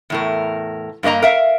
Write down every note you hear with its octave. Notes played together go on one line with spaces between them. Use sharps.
E2 A2 A#4
G2 A3 A#3 D#5 A#5
A#4 E5 F5